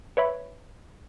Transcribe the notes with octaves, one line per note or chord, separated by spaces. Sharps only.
B4 C#5 E5 B5